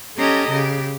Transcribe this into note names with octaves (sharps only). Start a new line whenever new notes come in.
C#4 G4 A4 D#5 G#5 A#5
C#3 G4